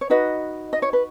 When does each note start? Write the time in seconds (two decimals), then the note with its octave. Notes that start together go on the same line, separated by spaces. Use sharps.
0.01 C#5
0.10 D#4 F#4 B4 D#5
0.73 D#5
0.82 C#5
0.93 B4